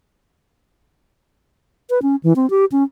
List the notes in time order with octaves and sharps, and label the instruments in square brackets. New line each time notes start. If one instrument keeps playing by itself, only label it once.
[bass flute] B4
C#4
E3
C4
G4
C#4